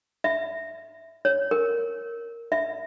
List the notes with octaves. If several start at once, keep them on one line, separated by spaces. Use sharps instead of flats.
E5
C#5
A#4
E5